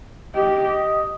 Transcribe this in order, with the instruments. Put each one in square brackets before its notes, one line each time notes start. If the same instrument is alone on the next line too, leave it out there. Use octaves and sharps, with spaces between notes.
[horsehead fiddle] G4 [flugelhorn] D#5